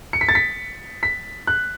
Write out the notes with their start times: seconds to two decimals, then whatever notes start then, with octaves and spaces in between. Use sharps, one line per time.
0.13 C#7
0.21 B6
0.29 A6
0.35 B6
1.03 B6
1.47 F#6